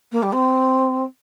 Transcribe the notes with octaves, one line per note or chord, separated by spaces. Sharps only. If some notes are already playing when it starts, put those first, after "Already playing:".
A#3
G3
C4